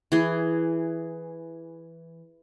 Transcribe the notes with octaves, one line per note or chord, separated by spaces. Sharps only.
E3 G#4